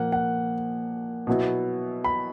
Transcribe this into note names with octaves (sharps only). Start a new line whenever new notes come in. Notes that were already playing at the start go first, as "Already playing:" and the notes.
Already playing: A#2 F3 A#3 F#5
F#5
B2 F#3 B3 E4
B5